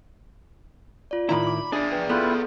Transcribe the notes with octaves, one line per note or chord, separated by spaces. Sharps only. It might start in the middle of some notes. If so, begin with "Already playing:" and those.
F4 D5
A2 D#3 E4 A#5 B5
D6
D4 G#4 D5 E5 G#5
B4 G5
B3 E4 F4 A4 B4 G6